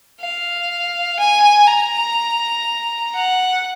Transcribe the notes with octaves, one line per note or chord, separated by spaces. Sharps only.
F5
G#5
A#5
F#5